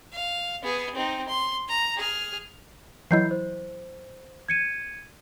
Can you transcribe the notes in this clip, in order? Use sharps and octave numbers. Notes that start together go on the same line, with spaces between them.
F5
B3 G#4
C4 D#4
C6
A#5
G#4 F6
E3 F#3 E4 D#5 G6 C7
C5
G#6 C#7 D#7